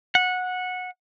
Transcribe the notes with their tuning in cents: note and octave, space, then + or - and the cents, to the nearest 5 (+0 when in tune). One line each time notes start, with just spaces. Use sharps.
F#5 -15